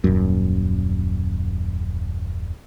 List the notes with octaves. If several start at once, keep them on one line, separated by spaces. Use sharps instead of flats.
D#1 F#2